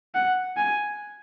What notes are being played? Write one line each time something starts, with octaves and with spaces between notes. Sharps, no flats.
F#5
G#5